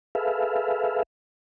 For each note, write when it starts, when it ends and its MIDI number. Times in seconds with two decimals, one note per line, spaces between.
0.15 1.03 68
0.15 1.03 69
0.15 1.03 71
0.15 1.03 76
0.15 1.03 77